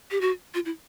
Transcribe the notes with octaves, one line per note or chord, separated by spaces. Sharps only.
G4
F#4
F4
E4